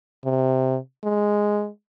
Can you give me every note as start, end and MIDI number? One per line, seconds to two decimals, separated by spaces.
0.25 0.78 48
1.04 1.69 56